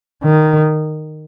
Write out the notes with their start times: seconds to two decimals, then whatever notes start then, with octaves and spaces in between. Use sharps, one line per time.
0.23 D#3